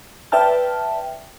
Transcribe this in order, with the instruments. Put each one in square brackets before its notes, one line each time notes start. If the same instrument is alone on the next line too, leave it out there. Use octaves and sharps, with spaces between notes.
[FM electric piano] B4 D5 E5 G5 A5 F6